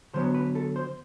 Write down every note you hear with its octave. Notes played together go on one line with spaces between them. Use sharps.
D3 F#3 B3 C5
B4
A4
C5